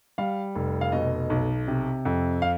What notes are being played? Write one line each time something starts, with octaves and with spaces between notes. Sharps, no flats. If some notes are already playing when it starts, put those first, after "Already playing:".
G3 F5
F1
F5
B2 D#5
B1
C3
F2
F5